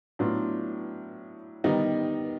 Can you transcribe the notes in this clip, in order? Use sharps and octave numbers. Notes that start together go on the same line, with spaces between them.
A2 F#3 B3 D4 F4
D#3 G3 B3 D#4